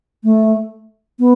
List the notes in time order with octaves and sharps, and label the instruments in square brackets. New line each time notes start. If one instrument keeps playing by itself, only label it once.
[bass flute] A3
B3